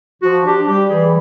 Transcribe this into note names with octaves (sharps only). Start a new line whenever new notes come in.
F3 F#4
D4 G4
G3 G4
E3 G#4